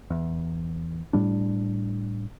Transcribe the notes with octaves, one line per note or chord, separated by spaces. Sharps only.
E2
A2 G3 D4